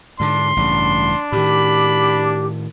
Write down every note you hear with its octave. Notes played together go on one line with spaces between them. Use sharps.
G#2 D3 D4 C6
A1 G2 C#3 D4
A2 D#3 G4 B5